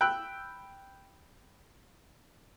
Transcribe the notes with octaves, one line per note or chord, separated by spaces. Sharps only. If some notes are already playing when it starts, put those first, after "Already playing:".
G5 B5 E6 F#6